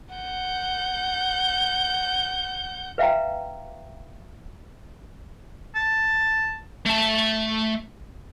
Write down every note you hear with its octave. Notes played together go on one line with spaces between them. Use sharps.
F#5 G6
B4 E5 F5 G5 A#5
A5
A3 A5